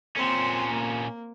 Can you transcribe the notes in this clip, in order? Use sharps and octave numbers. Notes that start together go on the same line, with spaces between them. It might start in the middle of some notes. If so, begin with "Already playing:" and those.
A#2 C4 C#4 C6
A#3